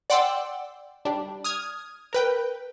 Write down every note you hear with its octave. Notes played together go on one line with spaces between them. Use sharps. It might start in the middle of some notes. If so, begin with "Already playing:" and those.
D5 F#5 G5 C6 D6 E6
G3 D4
D#6 F6 G#6
A#4 B4 G5